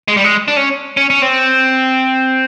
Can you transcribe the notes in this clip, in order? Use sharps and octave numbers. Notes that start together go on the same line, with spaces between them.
G#3
G3
G#3
D4
C#4
C#4
C#4
C4